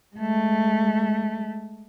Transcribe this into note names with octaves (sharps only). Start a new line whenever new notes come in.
G#3 A3